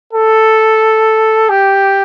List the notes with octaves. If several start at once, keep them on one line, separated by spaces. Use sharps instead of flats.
A4
G4